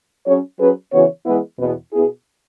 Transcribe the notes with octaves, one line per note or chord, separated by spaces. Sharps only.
F#3 C#4 G#4 C#5
F#3 C#4 G#4 B4
C#3 E3 B3 F#4 C#5
E3 G#3 B3 E4 B4
E2 B2 B3
B2 B3 E4 G#4